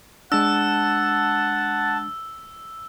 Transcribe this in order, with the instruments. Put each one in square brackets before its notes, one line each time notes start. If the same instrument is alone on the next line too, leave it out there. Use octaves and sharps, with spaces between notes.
[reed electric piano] G#3 D4 [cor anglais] F#5 [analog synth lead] A5 [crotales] E6